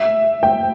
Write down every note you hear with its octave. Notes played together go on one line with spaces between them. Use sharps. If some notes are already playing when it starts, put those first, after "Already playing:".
Already playing: E5
G5